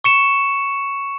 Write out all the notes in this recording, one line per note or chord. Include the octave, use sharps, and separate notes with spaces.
C#6 C#7 E7